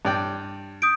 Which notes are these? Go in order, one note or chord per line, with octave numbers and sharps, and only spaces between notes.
G2 D5 G5
D#6 G6 D7